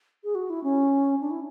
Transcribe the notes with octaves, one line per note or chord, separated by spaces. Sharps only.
G#4
F#4
E4
C#4
D4
E4